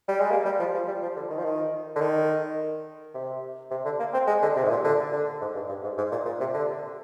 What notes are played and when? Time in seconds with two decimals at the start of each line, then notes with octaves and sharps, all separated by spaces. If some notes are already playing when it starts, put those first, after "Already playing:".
0.08 G3
0.20 G#3
0.31 A#3
0.45 G3
0.59 F3
0.74 F3
0.88 G3
1.02 F3
1.16 D3
1.30 D#3
1.38 F3
1.44 D#3
1.96 D3
2.01 D#3
3.14 C3
3.71 C3
3.85 D3
3.99 A#3
4.14 C4
4.27 G#3
4.42 D3
4.56 C3
4.64 G#2
4.70 A#2
4.84 D3
5.12 D3
5.41 G#2
5.55 G2
5.69 G2
5.83 G#2
5.97 G#2
6.11 A#2
6.25 A#2
6.40 C3
6.54 D3